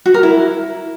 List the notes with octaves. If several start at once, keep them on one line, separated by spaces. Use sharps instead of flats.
F#4
A#4
E4